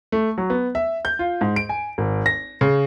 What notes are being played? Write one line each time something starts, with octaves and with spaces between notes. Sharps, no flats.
A3
F#3
B3
E5
G6
F4
G#2
D7
G#5
G#1
A#6
C#3